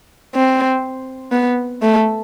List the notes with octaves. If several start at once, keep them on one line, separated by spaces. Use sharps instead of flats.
C4
B3
A3